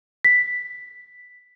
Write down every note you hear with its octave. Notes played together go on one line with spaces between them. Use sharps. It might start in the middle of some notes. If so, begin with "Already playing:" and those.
B6